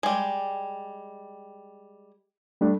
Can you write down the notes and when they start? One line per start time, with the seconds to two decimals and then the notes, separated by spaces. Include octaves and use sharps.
0.03 G3 G#3
2.61 G3 A3 D4